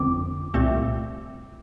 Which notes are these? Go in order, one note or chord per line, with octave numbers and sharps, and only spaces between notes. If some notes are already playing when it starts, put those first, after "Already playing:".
Already playing: G1 F2 D3 F3 C4 D6
C2 A#2 A3 C4